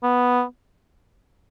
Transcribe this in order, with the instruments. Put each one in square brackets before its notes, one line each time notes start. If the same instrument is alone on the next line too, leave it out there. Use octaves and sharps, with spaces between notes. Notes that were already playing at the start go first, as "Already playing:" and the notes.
[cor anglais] B3